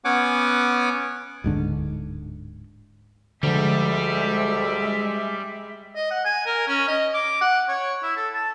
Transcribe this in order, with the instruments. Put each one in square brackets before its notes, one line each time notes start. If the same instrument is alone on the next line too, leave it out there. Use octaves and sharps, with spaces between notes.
[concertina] B3 C#4 C#5 F#5 G#5 D6
[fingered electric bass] D1 G#2 D3
[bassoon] D2 [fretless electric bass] D3 F3 [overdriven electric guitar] G3 [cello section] G#3 E5
[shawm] D#5
F#5
G#5
A#4
C#4
D#5
D6
F#5
C#5
E4
A4
A5